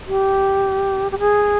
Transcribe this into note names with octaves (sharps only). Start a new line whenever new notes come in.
G4
G4
G#4